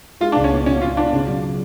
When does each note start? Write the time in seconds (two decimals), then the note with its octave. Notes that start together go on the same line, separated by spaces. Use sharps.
0.21 G#3 F4
0.32 D4
0.36 C#2
0.44 C#4
0.51 B3
0.66 B2 C#4
0.82 B2 F4
0.96 D4 F4
1.13 C#3
1.27 F#3